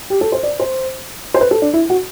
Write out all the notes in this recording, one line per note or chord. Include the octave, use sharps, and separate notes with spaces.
G4
A4
C5
D5
C5
C5
B4
A4
D4
E4
F#4